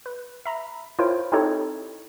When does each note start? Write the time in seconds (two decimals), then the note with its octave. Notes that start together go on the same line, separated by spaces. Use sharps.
0.06 B4
0.46 E5 A#5 B5
0.99 E4 F4 A#4 C5 C#5 G5
1.32 C4 D#4 E4 G4 A4 C#5